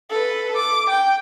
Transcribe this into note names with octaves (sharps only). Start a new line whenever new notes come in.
A4 B4
D6
G5